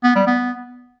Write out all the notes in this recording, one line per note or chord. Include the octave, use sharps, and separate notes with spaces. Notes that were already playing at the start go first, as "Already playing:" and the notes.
B3
G3
B3